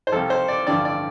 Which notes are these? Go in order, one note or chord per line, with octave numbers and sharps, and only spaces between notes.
C5
C2 C3 F3 A4
C5
D5
A1 G2 D3 F3 D5
D5